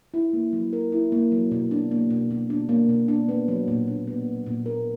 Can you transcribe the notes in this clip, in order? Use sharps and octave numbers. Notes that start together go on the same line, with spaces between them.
E4
A#3
F#3
A#4
E4
A#3
F#3
B2
D4
A#3
B2
B2
D4
A#3
B2
D4
B3
F#3
A#2
D4
B3
F#3
A#2
A#4